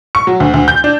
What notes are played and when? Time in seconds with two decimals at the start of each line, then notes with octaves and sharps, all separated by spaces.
0.15 C#6
0.27 F#3
0.40 D2
0.54 D2
0.68 G6
0.84 D4